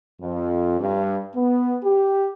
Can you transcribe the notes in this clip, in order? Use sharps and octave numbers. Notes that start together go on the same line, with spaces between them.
F2
G2
B3
G4